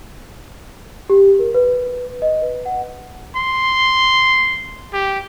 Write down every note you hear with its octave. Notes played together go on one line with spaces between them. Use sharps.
G4
A#4
B4
D#5
B4
F#5
C6
G4